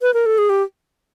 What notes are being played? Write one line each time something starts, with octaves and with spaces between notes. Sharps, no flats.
B4
A#4
A4
G#4
G4